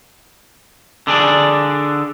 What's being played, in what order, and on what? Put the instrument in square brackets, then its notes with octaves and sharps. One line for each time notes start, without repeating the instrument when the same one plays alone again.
[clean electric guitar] D3 D4 G#4 D5